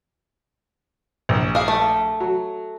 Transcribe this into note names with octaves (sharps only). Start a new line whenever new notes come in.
A#1
G#4 F5
A3
F#3